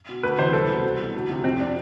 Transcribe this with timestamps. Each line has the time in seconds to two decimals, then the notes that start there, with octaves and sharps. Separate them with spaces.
0.09 B2
0.23 D2 B4
0.38 C3 E3 C5
0.53 C2 A4
0.69 B2
0.84 C2
0.99 B2
1.14 D2
1.29 C3 F3
1.44 F2 C4
1.59 C3 F3 D4